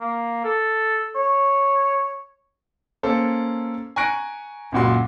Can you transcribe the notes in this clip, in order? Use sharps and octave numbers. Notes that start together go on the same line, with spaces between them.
A#3
A4
C#5
A#3 C#4 A4 C5
G#5 A#5 C#6 F#6 A#6 D7
C#2 F#2 A#2 F#4 C6